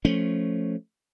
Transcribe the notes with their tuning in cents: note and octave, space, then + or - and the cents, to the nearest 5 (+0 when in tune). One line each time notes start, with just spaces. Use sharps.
F3 +0 A3 +5 C#4 +0